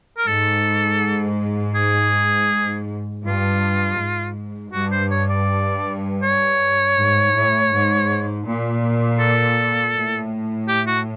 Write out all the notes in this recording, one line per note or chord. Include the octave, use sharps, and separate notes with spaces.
A#4
G#2 A4
G#4
G2 F4
G#2
G2 F#4
C5
C#5
D5
C#5
G#2
A2
G#2
A#2
A4
A2
G4
F#4